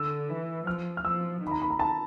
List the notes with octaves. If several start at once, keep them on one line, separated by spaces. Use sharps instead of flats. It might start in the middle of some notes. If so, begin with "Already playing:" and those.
Already playing: D3 E6
E3
F3 F6
F6
F3 E6
D#3 B5
A#5
B5
A#5
A5